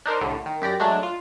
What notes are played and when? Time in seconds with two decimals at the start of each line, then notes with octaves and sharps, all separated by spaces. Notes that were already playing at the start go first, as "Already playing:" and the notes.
0.06 D4 D#4 A#4 C5
0.21 C2 A2 D3
0.46 D#3
0.62 F#2 G4 D5 A#6
0.80 F#3 G#3 A3 D4
1.03 F4